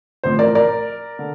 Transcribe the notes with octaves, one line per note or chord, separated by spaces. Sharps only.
A1 A2 F3 C4 C5
A#4 D5
A#4 D5
D3